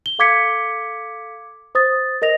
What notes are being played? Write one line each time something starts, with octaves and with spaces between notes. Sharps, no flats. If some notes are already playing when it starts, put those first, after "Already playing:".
G7
A4 F5 D6 G#6 B6 C#7
C5 D#6 A6
A#4 D#5 A#6 F7